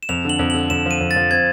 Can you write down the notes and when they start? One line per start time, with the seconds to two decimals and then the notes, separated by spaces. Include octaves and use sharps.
0.03 E7
0.09 F2 F7
0.25 D3 F#7
0.39 F2
0.50 D3 F#7
0.70 F2 E7
0.86 F3 D#7
1.00 F2
1.11 A6
1.16 F3
1.31 C4 G#6